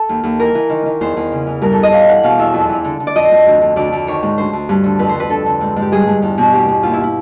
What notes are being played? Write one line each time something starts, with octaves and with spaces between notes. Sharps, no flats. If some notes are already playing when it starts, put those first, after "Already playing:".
Already playing: A4
D#2
D#2
E3 A#4
E3
D#3
D#3
E2 C5
E2
C#3
E3
G2 A#4
A4
E3
D#5
E3 F5
E3 F#5
B2 F5
E2 E5
F2
E3
D3
D3
D5
F2 D#5
F2
D2
D2
D2 D5
D2
D#3 C#5
G#2
D2 C5
D2
G2
D3
F2 B4
C5
D3 B4
D3 A4
D3
G#2
G#2
G4
G2 G#4
G2
E2
B2
E2 G4
B2
D#2 F4
E4
E4